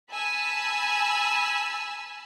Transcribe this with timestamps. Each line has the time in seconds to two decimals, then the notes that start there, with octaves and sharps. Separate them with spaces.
0.10 G#5 A5 B5 E6